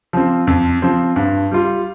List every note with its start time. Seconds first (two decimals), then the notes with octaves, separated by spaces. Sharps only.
0.13 F3 C4
0.47 F2
0.82 F3 C4
1.16 G2
1.51 G3 F4